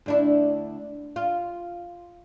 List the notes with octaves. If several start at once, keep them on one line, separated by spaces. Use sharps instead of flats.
D2 D4 E4
F4